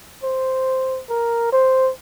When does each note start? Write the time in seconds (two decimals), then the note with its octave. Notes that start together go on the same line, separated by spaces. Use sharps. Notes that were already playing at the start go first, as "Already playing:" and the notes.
0.23 C5
1.09 A#4
1.52 C5